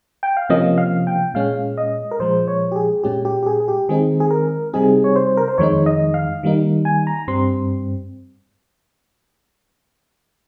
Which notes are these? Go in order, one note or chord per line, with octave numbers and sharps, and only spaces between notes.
G5
F5
C3 F3 A#3 C#4 D#5
F5
G5
A#2 G#3 C#4 F5
D#5
A#4
A#2 F3 G#3 C5
C#5
G4
G#4
A#2 G#3 C#4 G4
G4
G4
G#4
G#4
G4
D#3 G#3 C4 D#4 G#4
G#4
A#4
C3 G3 C4 D#4 G#4
C#5
C5
A#4
C5
F2 D#3 G#3 D#4 C#5
D#5
F5
D#3 G3 A#3 D#4
G#5
A#5
G2 G3 C4 C6